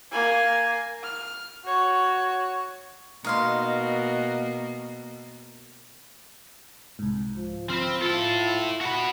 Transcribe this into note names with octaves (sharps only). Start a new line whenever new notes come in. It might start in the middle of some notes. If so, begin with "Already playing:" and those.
A#3 G#5
F6
F#4 C#5
B2 A#3 D#4 F5 C6
C2 G#2
F3
F3 C4 B5 F6
E4 F4 A4 C6
F#4 B5